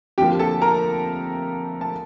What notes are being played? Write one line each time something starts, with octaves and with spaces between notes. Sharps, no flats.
F2 D3 F3 A#3 G4 G5
A4 A5
A#4 A#5
A5